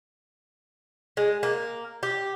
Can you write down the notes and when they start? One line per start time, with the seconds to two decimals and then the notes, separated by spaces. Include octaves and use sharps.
1.17 G#3
1.43 A#3
2.03 G4